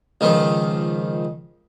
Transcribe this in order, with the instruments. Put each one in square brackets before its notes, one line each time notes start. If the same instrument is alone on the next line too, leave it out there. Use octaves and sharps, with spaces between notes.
[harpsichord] C#2 D#3 F3